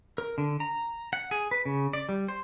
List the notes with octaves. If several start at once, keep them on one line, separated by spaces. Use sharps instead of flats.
A#4
D3
A#5
F#5
G#4
B4
C#3
D5
G3
C5